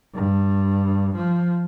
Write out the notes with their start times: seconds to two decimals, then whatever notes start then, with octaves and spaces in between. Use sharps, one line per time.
0.14 G2
1.16 F3